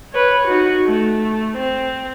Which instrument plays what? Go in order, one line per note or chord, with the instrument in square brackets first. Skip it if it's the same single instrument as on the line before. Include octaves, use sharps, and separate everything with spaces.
[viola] B4 C#5
D#4 F#4
A3
C4